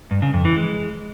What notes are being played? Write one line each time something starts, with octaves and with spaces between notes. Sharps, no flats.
G2
C#3
F2
E3
G#3